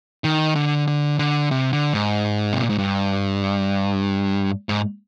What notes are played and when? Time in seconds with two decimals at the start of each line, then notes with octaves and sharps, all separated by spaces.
0.24 D#3
0.56 D3
0.88 D3
1.19 D3
1.51 C3
1.73 D3
1.94 G#2
2.53 C3
2.61 A#2
2.70 G#2
2.78 G2
4.69 G#2